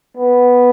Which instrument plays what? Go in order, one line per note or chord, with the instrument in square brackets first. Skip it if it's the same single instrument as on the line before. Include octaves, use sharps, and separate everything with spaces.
[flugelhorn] B3